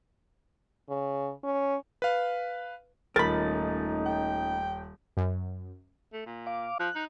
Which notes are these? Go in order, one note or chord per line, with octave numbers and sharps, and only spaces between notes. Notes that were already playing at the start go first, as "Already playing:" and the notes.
C#3
C#4
B4 F5
D#1 A3 C#4 D#4 A#4 B5 A6
G5
F#2
A3
A#2
F5 D6
F3 F#6
D#4